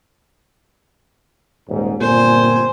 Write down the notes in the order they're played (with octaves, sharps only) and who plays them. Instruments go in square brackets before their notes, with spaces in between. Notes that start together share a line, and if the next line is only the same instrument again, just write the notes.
[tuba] D#1 [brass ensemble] G#2
[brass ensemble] G1 C4 G#5 [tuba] A#2 [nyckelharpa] C5